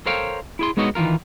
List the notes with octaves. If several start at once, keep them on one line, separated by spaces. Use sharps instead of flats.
A4 A#4 C5 C#5 F5 G5
E4 G#4 C6
G#3 B3 D#4 F#4 C#5 D#5
D#3 E3 F#3 F4 A#4